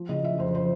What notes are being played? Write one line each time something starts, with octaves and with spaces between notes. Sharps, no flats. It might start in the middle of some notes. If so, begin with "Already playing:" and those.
Already playing: F3
C#3 D#5
F3 E5
F2 C5
F3 C5